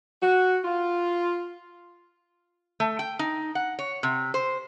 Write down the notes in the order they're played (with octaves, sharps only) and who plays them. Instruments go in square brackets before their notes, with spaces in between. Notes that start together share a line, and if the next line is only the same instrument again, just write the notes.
[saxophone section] F#4
F4
[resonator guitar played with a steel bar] A3
G5
D#4
F#5
C#5
C3
C5